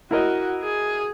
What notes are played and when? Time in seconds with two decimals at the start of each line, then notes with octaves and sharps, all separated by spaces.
0.11 E4 F#4 A#4 D#5
0.63 G#4